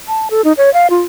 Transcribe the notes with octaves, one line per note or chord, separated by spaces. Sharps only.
A5
A4
D#4
C#5
F5
F4